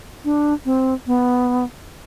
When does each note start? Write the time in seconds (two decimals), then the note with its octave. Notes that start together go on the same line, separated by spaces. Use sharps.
0.25 D4
0.66 C4
1.07 B3